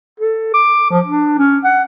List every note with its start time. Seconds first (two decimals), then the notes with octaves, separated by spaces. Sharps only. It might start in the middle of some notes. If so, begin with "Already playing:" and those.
0.20 A4
0.54 D6
0.90 F3
1.05 D4
1.38 C#4
1.64 F#5